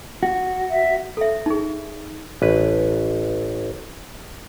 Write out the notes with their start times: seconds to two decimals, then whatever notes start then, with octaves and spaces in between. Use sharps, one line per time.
0.23 F#4
0.71 E5
1.17 A4 E5
1.46 D#4 G#4
2.42 A1 B4